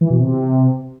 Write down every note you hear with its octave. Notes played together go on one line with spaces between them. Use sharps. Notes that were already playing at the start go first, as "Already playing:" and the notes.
E3
B2
C3